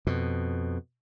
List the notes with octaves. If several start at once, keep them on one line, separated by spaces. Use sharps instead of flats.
F2 B2